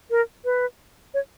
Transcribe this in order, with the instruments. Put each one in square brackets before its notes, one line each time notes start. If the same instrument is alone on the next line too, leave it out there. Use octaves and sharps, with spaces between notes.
[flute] A#4
B4
C#5